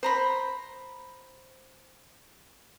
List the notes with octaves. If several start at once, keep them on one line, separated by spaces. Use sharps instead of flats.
C5 A#5 B5